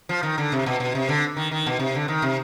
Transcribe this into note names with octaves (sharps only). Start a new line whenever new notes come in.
F3
D#3
D3
C3
B2
B2
C3
D3
D#3
D#3
B2
C3
D3
D#3
C3